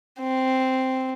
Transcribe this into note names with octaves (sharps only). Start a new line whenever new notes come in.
C4